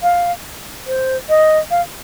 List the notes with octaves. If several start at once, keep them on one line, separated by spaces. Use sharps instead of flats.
F5
C5
D#5
F5